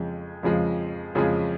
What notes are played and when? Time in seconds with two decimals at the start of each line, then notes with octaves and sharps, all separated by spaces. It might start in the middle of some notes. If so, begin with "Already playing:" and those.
Already playing: F2 C#3 F3 G#3
0.43 F2 C#3 F3 G#3
1.15 F2 C#3 F3 G#3